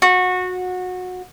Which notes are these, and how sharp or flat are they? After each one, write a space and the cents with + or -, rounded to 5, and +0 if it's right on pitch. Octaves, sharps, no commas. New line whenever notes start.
F#4 -20